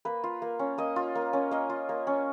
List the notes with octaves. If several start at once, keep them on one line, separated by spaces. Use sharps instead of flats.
A#3 B4
F4
A#3
C#4
A#3 D#5
F4
A#3
C#4
A#3 D#5
F4
A#3
C#4